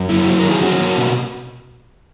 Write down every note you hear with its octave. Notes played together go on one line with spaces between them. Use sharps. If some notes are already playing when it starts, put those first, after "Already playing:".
Already playing: F#2
A#3 E4
F#3
D#3 A#4
G#4
C#4 F#4
A#3
B2